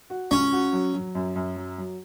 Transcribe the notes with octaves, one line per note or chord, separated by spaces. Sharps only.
F#4
C#2 C#4
F#4
F#3
F#3
F#2
F#2
F#3
F#3